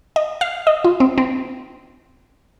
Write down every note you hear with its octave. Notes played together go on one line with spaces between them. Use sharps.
D#5
F5
D#5
F4
C4
C4